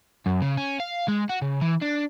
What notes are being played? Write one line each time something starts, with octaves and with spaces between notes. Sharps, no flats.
F#2
C#3
C#4
F5
G#3
F#4
C#3
E3
D4